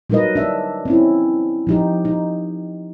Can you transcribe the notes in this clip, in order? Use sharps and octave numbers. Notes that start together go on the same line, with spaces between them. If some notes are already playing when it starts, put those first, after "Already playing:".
F#3 G3 D#4 A#4 B4 D#5
D4 E5
C4 C#4 E4
F3 D#4 G4
D#4